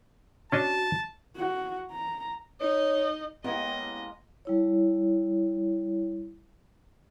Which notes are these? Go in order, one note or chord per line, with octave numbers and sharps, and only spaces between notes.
C#4 D4 F#4 D#5 A5
F#4
A#5
D#4 C#5 D#5
G#3 A#3 B3 C#4 E4 G4 D#5
G3 E4 C#5